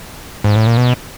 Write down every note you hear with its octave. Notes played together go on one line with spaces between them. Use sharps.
G#2
A2
A#2
B2